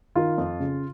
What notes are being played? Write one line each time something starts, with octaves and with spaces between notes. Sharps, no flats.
D#3 F4
F2
C#3